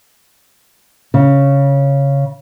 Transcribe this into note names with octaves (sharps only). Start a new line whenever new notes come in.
C#3